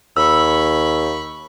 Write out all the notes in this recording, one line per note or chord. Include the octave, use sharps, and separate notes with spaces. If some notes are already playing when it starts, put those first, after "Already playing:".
D#2 B5 C#6 E6